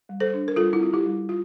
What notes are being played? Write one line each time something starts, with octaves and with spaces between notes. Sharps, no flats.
G3
A4 C5
D4
A#4
G3 F4 A4
E4
C4 F4
E4 G4
G3
F4